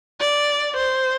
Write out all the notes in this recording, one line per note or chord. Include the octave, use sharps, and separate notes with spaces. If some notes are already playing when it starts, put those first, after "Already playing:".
D5
C5